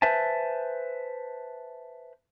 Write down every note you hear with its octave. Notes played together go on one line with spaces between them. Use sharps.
B4 C5 E5 G#5 A5